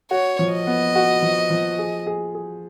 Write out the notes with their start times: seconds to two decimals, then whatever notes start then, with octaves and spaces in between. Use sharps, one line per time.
0.11 F#4 C#5
0.39 F3
0.52 D#5
0.67 B3
0.96 F#4
1.22 F3
1.50 F3
1.79 G#4
2.07 G#4
2.35 G#4